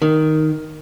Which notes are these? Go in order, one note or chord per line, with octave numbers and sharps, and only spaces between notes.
D#3